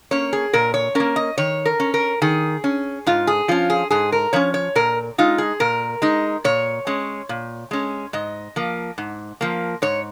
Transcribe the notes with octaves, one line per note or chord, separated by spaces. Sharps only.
A#3 C#4 C#5
G#4
A#2 A#4
C#5
A#3 C#4 A#4
D#5
D#3 C#5
A#4
C#4
A#4
D#3 G#4
C#4
G#2 F4
G#4
F3 C#4 F4
G#4
G#2 G#4
A#4
F3 C#4 C#5
C#5
A#2 A#4
G#3 D#4 F4
G#4
A#2 A#4
G#3 D#4
A#2 C#5
G#3 C#4
A#2
G#3 C#4
G#2 D#5
F3 A#3
G#2
F3 A#3
G#2 C#5